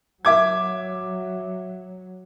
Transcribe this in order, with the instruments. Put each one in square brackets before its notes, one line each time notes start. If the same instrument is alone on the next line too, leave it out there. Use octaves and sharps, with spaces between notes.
[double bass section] F#3 [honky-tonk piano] E5 D6 G#6